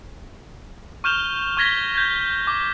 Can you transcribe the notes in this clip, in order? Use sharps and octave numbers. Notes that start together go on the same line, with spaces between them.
C#6 F6 G6 E7 F7 G7
C#6 F6 G#6 A#6 B6 G7
G6 G#6
D6